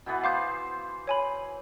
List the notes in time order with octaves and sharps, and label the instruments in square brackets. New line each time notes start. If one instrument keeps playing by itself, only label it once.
[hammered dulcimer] B2 E3 B3
[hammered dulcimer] C5 [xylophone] F5 D6 G6
[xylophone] C#5 G#5 B5